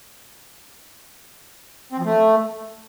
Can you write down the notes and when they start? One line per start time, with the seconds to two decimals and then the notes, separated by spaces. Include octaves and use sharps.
1.92 C4
1.99 F3
2.05 A3